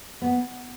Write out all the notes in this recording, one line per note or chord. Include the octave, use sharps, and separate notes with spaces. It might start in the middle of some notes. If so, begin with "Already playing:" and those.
B3